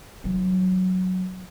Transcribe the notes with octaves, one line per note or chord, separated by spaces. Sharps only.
E3 F#3